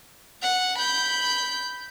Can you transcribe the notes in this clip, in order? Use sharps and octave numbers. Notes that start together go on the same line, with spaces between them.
F#5
B5 G6